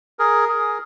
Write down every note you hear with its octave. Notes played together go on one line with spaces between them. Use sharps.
G#4 A#4
G#4